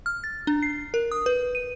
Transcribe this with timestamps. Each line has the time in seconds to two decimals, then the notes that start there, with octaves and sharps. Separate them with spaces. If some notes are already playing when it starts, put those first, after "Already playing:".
0.06 F6
0.24 A6
0.47 D4
0.62 C7
0.94 A#4
1.11 D#6
1.26 B4
1.55 D#7